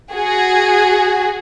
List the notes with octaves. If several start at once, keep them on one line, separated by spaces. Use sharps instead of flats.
F#4 G#4